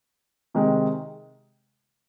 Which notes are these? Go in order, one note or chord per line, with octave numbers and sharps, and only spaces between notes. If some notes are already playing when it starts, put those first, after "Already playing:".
C3 D#3 G#3